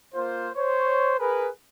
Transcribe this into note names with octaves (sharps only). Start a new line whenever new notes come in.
A#3 F4 C5
C5 C#5
G#4 A#4 B4